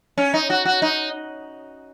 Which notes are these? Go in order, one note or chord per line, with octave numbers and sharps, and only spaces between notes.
C#4
D#4
F#4
F#4
D#4